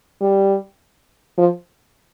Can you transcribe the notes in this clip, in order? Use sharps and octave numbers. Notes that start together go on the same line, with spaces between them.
G3
F3